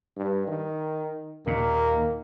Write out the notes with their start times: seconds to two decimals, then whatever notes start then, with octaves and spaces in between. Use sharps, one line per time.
0.17 G2
0.47 D#3
1.47 D#2 A#2 D#3 A#3